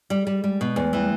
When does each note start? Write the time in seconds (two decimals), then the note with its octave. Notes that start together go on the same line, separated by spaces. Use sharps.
0.10 G3
0.27 G3
0.43 G3 G#3
0.61 B2
0.76 E2 A3
0.84 G#3
0.91 E3 G3
0.98 G#3